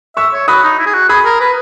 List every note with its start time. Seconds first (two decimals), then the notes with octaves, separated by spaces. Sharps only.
0.17 E5 C#6 E6
0.33 C#5
0.48 F#4 B5 D#6
0.63 D#4
0.79 E4
0.86 G#4
0.94 F#4
1.09 G#4 B5 D#6
1.25 A#4
1.40 B4